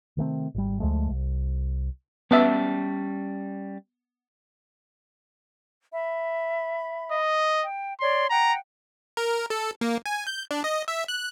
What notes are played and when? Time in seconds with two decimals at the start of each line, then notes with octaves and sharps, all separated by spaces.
0.17 C3 D#3 A3 C4
0.55 G#1 G3
0.80 D2 F3 G#3 A3
1.09 C2
2.31 G3 B3 C#4 E5 A5
5.93 E5 B5
7.12 D#5
7.65 G5
8.00 C#5 D5 C6
8.30 F#5 G5 A#5
9.17 A#4
9.50 A4
9.81 A#3
10.06 G#5
10.27 G6
10.51 D4
10.64 D#5
10.88 E5
11.08 F#6